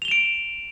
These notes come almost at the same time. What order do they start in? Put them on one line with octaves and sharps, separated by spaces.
F7 G7 E7 D7